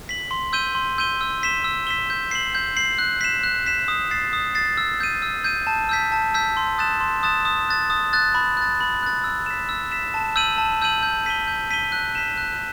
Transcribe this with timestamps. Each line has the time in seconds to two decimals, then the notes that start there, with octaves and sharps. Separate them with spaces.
0.09 B6 F#7
0.31 C6
0.53 E6 G6 D#7 G7
0.75 C6
0.98 E6 G6 D#7 G7
1.21 E6
1.43 B6 E7 G7
1.64 E6
1.87 B6 E7 G7
2.10 G6
2.31 C7 F#7
2.55 G6
2.77 C7 F#7
2.99 F#6
3.21 B6 E7
3.44 F#6
3.66 B6 E7
3.88 D#6
4.11 A6 C7
4.33 D#6
4.55 A6 C7
4.78 E6
5.00 G6 D#7
5.22 E6
5.44 G6 D#7
5.67 A5
5.89 E6 G6 B6
6.12 A5
6.34 E6 G6 B6
6.57 C6
6.78 D#6 F#6 A6 E7
7.01 C6
7.23 D#6 F#6 A6 E7
7.45 D#6
7.69 F#6 A6
7.90 D#6
8.13 F#6 A6
8.35 B5
8.57 F#6 A6
8.80 B5
9.03 F#6 A6
9.24 E6
9.46 B6 E7
9.69 E6
9.92 B6 E7
10.14 A5
10.36 E6 G6 D#7 F#7
10.58 A5
10.82 E6 G6 D#7 F#7
11.03 G6
11.26 B6 D#7 G7
11.47 G6
11.71 B6 D#7 G7
11.92 F#6
12.15 B6 E7
12.37 F#6